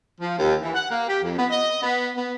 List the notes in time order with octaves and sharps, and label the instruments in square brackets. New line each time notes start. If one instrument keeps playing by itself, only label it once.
[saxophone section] F3
D#2
E3
F#5
A#3
G4
F2
B3
D#5
B3
B3